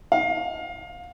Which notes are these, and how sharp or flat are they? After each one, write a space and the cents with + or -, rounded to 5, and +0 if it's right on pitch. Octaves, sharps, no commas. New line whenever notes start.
F5 +25